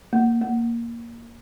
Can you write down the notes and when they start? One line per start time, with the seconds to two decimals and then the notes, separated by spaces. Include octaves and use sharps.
0.13 A#3
0.42 A#3